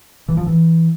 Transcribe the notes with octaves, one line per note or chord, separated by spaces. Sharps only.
E3
F3
E3